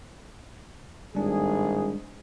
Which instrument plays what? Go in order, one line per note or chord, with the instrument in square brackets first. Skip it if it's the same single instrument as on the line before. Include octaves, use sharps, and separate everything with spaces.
[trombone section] G#1 A2 G#4 [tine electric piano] G3 G#3 D4